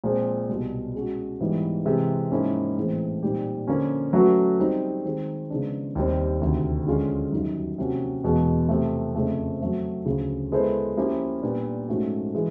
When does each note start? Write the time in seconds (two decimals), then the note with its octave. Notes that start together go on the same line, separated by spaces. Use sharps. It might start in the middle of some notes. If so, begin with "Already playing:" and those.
0.04 A#2 F3 G#3 C4
0.49 C2 B2 G3
0.95 G#3 C#4 F#4
1.40 G#2 E3 G3 B3
1.85 C3 E3 G#3
2.32 G#2 F3 A#3 C#4 E4
2.76 A2 E3 G#3 C4
3.23 A#2 G3 C4 D#4 G4
3.68 D3 F3 A#3 C#4
4.13 F#3 A3 C#4 F#4 B4
4.59 G3 C4 D#4
5.05 D#3 G#3 C4
5.50 C#3 F3 G#3 B3 D4
5.95 D#2 D#3 G3 C4
6.41 D2 C3 D#3
6.87 D3 F3 G#3 C#4 F4
7.32 F#2 D#3 G3 B3 D#4
7.78 C3 F3 A#3 C#4 F#4
8.24 E2 B2 G#3
8.69 C3 F3 A3
9.15 F2 C#3 F3 A3
9.60 F#3 A3 C4
10.06 D2 C#3 F3
10.52 G#3 B3 E4 A4 C5
10.97 F3 A#3 C#4 E4 G4
11.42 A#2 G3 B3 D4
11.88 G#2 F3 A3 C#4 F#4
12.35 E3 G#3